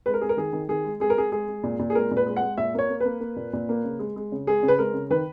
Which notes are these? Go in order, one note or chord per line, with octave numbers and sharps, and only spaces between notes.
G#3 B4
A#4
G#3 G#4
A#4
D#3 G#4
D#3
D#3 G#4
G#3
G#3 G#4
A#4
G#3 G#4
G#3 G#4
G#3
A#2
A#2
G#4
G#3 A#4
A#2
B4
G#3
F#5
G#3
A#2 E5
A#3 C#5
A#3
B4
A#3
A#3
A#2
A#2
A#3
C#3
G#3
G#3
C#3
G#3 G#4
C#3
B4
G#3 A#4
C#3
D#3 B4